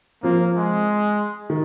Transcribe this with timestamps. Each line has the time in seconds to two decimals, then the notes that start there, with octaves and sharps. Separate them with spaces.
0.23 F3 A#3 C4 F4
0.55 G#3
1.50 D#3